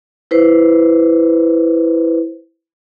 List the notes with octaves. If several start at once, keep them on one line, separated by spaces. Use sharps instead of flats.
E4 B4 C5